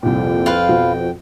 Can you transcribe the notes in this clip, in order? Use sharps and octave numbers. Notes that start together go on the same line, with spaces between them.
C2 F2 A#2 G5
F4 B4 F5
B2 F3 F#4